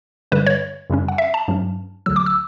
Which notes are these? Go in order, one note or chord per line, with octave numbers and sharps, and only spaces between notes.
G2 D3 G3 B4
C#5
F#2 C#3 G3 C#4
F#5
E5
A5
G2 F#3 C#4
D2 D3 F#3 E6
D6
E6